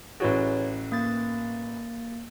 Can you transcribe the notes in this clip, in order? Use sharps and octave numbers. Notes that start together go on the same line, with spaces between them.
A1 E3 F#4 G#4 C#5
A#3 A6